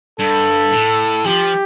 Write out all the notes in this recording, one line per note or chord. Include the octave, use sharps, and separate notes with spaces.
G2 A4
A2
F3 G4